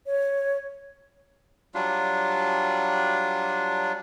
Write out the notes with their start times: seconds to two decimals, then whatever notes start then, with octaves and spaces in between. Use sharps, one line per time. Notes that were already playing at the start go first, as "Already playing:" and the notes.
0.06 C#5
1.74 F#3 G3 D4 F4